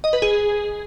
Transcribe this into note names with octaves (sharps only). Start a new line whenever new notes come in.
D#5
B4
G#4